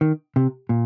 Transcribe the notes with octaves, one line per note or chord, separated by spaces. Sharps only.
D#3
C3
A#2